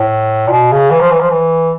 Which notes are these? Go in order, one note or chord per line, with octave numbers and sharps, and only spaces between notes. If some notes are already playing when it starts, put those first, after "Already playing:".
Already playing: A2
A#2
B2
C#3
E3
F3
E3
F3
E3